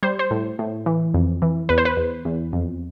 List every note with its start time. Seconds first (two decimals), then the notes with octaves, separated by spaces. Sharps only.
0.03 G3 C5
0.19 C5
0.31 A2
0.59 A2
0.86 E3
1.14 F2
1.42 E3
1.69 E2 B4
1.78 C5
1.85 B4
1.97 E2
2.25 E2
2.53 F2